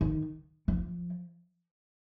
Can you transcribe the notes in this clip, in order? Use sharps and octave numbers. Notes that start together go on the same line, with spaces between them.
D#3
F3